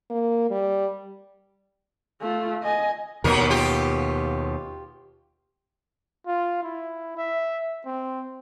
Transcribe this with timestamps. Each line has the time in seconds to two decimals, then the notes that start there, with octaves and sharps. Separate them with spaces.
0.10 A#3
0.50 G3
2.22 A3 F4
2.63 D#5 G#5
3.24 D#2 B2 F#3 A#4
3.50 F4 G4
6.27 F4
6.63 E4
7.17 E5
7.86 C4